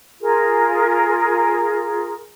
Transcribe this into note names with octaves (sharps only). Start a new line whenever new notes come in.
F4 G#4 A#4